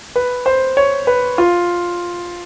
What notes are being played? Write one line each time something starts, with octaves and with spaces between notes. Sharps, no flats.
B4
C5
C#5
B4
F4